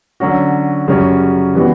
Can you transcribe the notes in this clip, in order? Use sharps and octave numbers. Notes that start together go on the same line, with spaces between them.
D3 F#3 C#4 F#4
F#2 C#3 G3 C#4 F#4
E3 G3 B3 F#4